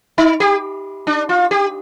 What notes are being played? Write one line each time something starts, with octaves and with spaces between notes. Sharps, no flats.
D#4
G4
D4
F4
G4